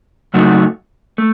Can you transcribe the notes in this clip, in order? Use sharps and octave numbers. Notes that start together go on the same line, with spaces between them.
C#3 F#3 A3 D#4 F#4
A3